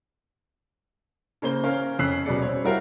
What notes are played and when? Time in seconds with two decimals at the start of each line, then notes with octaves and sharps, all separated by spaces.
1.42 C#3 A#3 C5 G7
1.64 C#4 A#4 C5 C#5 F5
1.99 F2 C#4 E6 F#6 B6 C7
2.25 D#1 B2 F#3 G#4 D5 C#7
2.42 C5 C#5
2.64 G3 E4 F#4 A#4 C5 F5